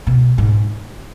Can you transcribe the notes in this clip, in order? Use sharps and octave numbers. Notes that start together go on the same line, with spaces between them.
B2
G#2